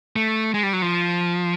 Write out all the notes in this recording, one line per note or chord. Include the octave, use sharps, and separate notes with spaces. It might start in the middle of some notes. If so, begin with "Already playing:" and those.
A3
G#3
G3
F#3
F3